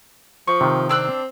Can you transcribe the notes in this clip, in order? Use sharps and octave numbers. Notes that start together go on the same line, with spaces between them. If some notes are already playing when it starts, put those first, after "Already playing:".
F3 C#6
C3 D#3
C4 D4 E6 F#6